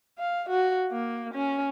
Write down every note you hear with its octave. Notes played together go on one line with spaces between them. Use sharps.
F5
F#4
A#3
C#4